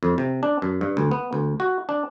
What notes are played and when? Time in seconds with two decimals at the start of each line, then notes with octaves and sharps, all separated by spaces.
0.03 F2
0.18 C3
0.43 D4
0.62 F#2
0.81 G2
0.97 D2
1.11 B3
1.33 D2
1.60 F#4
1.89 D4